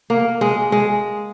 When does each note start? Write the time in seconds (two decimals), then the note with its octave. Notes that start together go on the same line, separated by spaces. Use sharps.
0.10 A#3
0.41 G#3
0.72 G#3